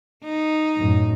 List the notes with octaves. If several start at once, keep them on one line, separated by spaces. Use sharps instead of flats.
D#4
F#2 A2